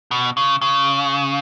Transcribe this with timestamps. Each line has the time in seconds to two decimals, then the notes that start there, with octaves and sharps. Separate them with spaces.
0.11 B2
0.37 C#3
0.62 C#3